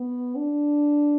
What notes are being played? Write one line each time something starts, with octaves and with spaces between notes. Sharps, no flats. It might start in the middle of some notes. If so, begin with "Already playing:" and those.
Already playing: B3
D4